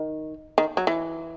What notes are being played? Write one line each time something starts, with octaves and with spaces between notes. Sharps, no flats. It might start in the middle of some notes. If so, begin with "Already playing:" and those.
Already playing: D#3
D#3
F#3
E3